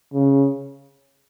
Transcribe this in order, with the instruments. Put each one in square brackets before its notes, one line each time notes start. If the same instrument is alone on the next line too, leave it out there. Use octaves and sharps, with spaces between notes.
[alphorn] C#3